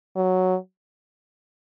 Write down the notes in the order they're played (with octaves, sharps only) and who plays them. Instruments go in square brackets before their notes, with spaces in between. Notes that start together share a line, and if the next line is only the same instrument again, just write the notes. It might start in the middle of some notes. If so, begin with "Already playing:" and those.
[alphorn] F#3